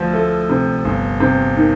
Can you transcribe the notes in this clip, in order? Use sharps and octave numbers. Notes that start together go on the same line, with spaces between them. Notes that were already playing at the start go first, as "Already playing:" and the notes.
Already playing: D2 F3
A3
C3
G1
C3
D#3